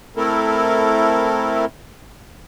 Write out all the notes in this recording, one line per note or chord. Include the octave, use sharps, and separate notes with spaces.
A3 C4 E4 A4 A#4